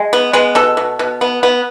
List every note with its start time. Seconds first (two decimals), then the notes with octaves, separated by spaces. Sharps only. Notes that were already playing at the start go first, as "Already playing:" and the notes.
Already playing: G#3
0.13 B3
0.33 G#3 B3
0.55 B2 A4
0.77 B2
0.99 B2
1.21 B3
1.43 B3